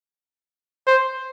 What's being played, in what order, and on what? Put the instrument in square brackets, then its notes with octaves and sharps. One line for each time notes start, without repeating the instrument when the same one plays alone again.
[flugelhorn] C5